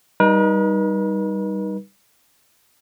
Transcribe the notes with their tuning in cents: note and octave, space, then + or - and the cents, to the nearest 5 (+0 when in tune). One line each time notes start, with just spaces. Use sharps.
G3 +0 D#4 +0 B4 -45